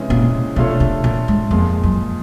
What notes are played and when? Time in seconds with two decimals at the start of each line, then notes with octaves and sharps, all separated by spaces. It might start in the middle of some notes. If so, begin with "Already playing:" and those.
Already playing: C3 E3 G#3 C#4
0.10 A#2
0.56 B2 A3 D4 F4 A4 C#5
0.80 C3
1.04 A#2
1.28 G#2
1.51 F2 A#2 F3 G#3
1.83 F#2